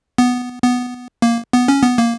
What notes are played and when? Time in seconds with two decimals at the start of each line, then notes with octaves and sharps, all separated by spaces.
0.18 B3
0.63 B3
1.22 A#3
1.53 B3
1.68 C#4
1.83 B3
1.98 A#3